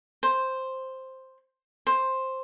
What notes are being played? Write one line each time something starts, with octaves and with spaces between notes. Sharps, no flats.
C5
C5